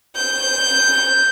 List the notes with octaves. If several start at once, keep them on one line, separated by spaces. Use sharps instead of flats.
G6